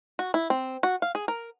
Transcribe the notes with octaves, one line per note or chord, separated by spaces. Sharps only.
F#4
E4
C4
F#4
F5
G#4
A#4